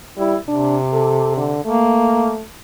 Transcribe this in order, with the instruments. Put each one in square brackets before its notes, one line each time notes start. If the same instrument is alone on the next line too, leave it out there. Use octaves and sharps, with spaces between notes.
[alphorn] G3 [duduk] E4
[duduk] C3 [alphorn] D4
[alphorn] A4
D3
[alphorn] A3 [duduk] A#3